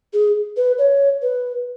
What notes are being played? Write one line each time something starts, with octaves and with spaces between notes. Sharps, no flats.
G#4
B4
C#5
B4